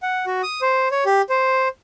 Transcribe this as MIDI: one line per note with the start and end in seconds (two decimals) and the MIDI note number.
0.03 0.25 78
0.27 0.42 66
0.43 0.61 87
0.62 0.88 72
0.91 1.04 73
1.06 1.22 67
1.30 1.68 72